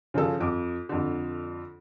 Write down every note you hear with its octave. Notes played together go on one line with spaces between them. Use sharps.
C#3 F3 C#4 A4
F2 D6
F2 D3